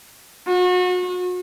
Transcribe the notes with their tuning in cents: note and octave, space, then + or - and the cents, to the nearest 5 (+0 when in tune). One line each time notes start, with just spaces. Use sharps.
F#4 -35